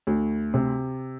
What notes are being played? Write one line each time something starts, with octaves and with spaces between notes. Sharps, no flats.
D2
C3